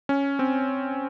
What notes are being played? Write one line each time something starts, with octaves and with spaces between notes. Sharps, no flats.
C#4
C4